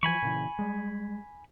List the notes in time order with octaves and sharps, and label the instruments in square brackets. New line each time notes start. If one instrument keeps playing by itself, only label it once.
[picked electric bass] E3 F3 [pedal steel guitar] G#5 B5 C#6
[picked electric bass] A#2 C#3 E3
G3 G#3